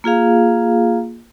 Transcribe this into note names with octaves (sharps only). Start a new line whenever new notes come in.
A#3 F4 G#4 F5